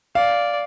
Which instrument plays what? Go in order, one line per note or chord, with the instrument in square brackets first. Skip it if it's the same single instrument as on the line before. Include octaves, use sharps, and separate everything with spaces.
[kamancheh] D5 [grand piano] F5